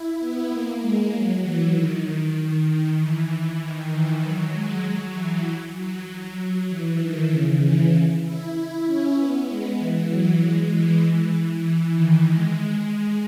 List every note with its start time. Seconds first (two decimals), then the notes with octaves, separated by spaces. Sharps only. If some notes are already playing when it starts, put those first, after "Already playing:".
Already playing: E4
0.20 B3
0.51 A#3
0.81 G#3
1.13 F#3
1.43 E3
1.74 D#3
2.36 D#3
2.67 D#3
2.98 E3
3.28 E3
3.60 D#3
3.91 E3
4.22 F#3
4.53 G#3
4.83 F#3
5.14 E3
5.76 F#3
6.07 F#3
6.69 E3
7.00 D#3
7.30 C#3
7.62 E3
8.24 E4
8.55 E4
8.86 C#4
9.17 B3
9.47 G#3
9.78 E3
10.09 F#3
10.40 G#3
10.71 E3
11.03 E3
11.64 E3
11.95 D#3
12.26 G#3